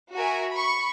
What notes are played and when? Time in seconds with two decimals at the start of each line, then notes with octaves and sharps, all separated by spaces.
0.14 F#4 A#4 E5 G#5
0.53 B5 C#6